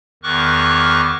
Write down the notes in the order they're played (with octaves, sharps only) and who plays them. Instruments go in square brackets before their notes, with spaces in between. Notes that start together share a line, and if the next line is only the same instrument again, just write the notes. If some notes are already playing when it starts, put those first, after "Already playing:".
[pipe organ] E2 D#3 C#6 D6 F6 F#6